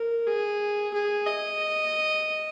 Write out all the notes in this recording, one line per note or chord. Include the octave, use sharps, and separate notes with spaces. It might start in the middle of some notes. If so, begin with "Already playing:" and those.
Already playing: A#4
G#4
G#4
D#5